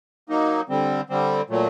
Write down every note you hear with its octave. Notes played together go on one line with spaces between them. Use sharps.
F#3 A#3 D#4
D3 G3 C4
D3 G3 C4
A#2 F#3 A3